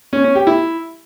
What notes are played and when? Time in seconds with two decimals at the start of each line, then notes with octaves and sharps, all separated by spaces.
0.13 C#4
0.24 C#4
0.35 G4
0.47 E4